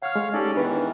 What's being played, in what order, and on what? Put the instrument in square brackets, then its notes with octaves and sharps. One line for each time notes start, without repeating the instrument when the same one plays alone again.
[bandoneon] C#5 F5 [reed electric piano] F#5 F6
[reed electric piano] G#3 A3
[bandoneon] C#4 A4 D5 [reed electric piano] D#4 G4
[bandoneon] E2 D#3 E3 [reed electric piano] D4 B4